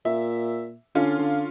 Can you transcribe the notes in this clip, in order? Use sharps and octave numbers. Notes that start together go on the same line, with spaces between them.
A#2 E5
D3 C#4 F4
D3